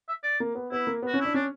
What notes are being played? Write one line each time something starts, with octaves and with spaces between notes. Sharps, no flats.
E5
D5
A#3
B3
B3 E4
A#3
B3
F#4
C#4
D4 E4
C#4 D4